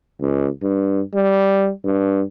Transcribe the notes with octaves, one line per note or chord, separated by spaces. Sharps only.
C#2
G2
G3
G2